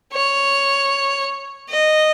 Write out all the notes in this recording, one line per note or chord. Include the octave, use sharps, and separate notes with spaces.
C#5
D#5